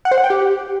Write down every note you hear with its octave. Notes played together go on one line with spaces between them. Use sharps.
F#5
C5
F#5
G5
G4